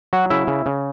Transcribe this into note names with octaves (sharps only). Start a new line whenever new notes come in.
F#3 F#4 F#5
C#3 E4 E5
C#3
C#3